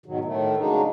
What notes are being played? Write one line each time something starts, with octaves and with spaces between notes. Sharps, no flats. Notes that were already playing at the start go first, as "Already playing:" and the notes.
G#2 B2 D#3 F#3
A2 D#3 A3
C#3 F#3 G#3 D4 D#4